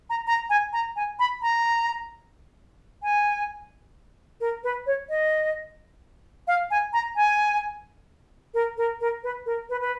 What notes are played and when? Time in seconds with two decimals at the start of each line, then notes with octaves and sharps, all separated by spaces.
0.10 A#5
0.27 A#5
0.50 G#5
0.73 A#5
0.96 G#5
1.19 B5
1.42 A#5
3.03 G#5
4.41 A#4
4.64 B4
4.86 C#5
5.09 D#5
6.48 F5
6.71 G#5
6.93 A#5
7.16 G#5
8.54 A#4
8.77 A#4
9.01 A#4
9.24 B4
9.46 A#4
9.70 B4
9.81 B4